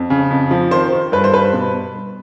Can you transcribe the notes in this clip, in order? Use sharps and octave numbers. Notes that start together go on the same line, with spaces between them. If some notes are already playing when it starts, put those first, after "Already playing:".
Already playing: F2
C#3
F2
F3
D#3 C5
D#3
G2 B4
C5
G2 B4
B2